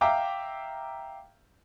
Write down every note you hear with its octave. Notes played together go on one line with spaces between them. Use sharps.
E5 F5 G5 A#5 D6